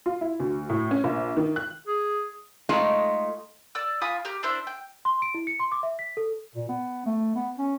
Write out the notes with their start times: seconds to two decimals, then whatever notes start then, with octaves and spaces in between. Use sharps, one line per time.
0.06 F4
0.21 E4
0.40 D2
0.69 A2
0.91 C#4
1.04 A#1
1.37 D#3
1.56 F#6
1.87 G#4
2.69 G#3 A3 D#4 F4 A4
3.75 D5 E6
4.02 F4 G#5 B5 D#6
4.25 G4 A#5 F6
4.43 D4 E4 C5 E5
4.67 G5
5.05 C6
5.22 D7
5.34 E4
5.47 C#7
5.60 C6
5.72 D6
5.83 E5
5.99 B6
6.17 A4
6.55 A#2
6.69 B3
7.06 A3
7.35 B3
7.58 C#4